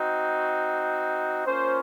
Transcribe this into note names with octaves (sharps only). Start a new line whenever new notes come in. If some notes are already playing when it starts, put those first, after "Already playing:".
Already playing: C4 D#4 F#4
A#3 C#4 F4 C5